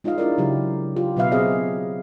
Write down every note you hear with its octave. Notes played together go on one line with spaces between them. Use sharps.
G#3 D#4 F4 D#5 F5
D4 E4 F4 A#4 D5
C#3 F#3 G4
F4 G4
B2 F#3 B4 E5 F5
C4 G#4 D#5 F5